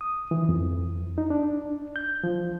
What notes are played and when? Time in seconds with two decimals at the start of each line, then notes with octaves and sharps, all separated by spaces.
0.01 D#6
0.31 E3
0.49 F2
1.18 D#4
1.30 D4
1.96 G6
2.24 F3